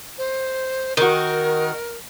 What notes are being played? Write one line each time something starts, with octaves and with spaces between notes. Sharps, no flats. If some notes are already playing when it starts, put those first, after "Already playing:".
C5
D#3 F#4 A#4